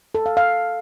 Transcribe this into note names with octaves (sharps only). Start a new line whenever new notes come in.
A4
F5
F5